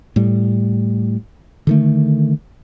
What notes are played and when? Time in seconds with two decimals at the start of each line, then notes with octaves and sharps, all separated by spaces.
0.16 A2 G3
1.67 D3 D#3 A3